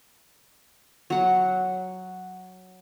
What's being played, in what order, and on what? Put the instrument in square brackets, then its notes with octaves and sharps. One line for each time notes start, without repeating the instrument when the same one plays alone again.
[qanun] F#3 F#5